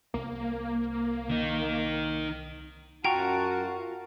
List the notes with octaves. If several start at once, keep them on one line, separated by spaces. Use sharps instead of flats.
C2 A#3
D#3 D#4
F#2 F4 F#4 F#5 G5 A5 A#5 C#6